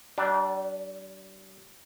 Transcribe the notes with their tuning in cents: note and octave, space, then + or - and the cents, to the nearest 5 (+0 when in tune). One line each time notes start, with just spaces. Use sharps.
G3 -40 D4 +0